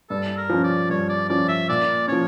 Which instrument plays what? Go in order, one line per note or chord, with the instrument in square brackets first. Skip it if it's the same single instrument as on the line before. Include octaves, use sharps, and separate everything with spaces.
[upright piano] G2 [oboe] A4
[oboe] A#4
[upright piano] F3 C#4
[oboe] D5
[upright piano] G2 [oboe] C#5
[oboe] D5
[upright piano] F3 C#4 [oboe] D5
[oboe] E5
[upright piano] A#2 [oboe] D5
[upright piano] F3 C#4 [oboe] C#5